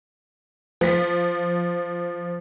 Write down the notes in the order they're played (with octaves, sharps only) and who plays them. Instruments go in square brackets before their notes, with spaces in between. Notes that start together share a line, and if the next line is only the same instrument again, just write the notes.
[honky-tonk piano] F3 B6